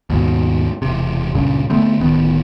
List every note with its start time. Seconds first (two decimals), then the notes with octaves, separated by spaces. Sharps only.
0.10 D#2 G#2 B2
0.82 E1 C3
1.35 C#2 G2 A#2 C#3
1.70 D3 A3 B3 C4
2.00 D1 D#3 B3